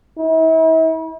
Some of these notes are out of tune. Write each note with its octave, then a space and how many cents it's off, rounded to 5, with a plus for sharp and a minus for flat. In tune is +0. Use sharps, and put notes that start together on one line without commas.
E4 -40